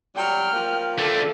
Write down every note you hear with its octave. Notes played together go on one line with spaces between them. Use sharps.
F#3 G3 G5 F6
F3 A#3
D3 A3 A4